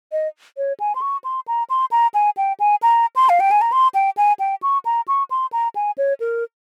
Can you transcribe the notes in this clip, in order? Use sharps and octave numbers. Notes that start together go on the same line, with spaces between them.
D#5
C#5
G#5
C6
C#6
C6
A#5
C6
A#5
G#5
G5
G#5
A#5
C6
F5
G5
G#5
A#5
C6
G5
G#5
G5
C#6
A#5
C#6
C6
A#5
G#5
C#5
A#4